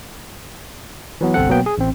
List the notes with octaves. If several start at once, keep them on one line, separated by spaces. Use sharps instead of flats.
E3 F#3 B3
G1 C2 C4 A4 F#5
B2 F#3 A#3 B3 G5
G#4
A1 C4